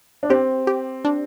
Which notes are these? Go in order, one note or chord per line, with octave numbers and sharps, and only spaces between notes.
D4
C4 G4
G4
D4